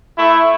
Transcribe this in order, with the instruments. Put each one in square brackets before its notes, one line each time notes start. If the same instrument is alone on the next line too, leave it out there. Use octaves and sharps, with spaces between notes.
[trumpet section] A3 E4